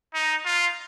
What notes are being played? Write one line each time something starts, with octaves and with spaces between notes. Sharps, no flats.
D#4
F4